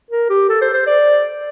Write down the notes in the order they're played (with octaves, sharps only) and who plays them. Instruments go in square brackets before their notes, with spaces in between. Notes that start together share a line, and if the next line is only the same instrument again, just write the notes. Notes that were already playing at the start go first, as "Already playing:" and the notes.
[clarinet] A#4
G4
A4
C5
C5
D5